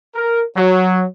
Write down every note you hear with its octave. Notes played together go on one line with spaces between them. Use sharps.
A#4
F#3